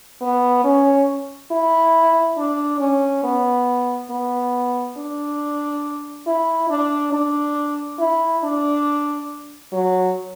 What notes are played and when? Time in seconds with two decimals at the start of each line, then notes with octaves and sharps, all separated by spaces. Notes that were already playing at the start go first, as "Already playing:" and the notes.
0.22 B3
0.64 C#4
1.51 E4
2.38 D4
2.80 C#4
3.24 B3
4.10 B3
4.97 D4
6.27 E4
6.70 D4
7.12 D4
7.99 E4
8.43 D4
9.72 F#3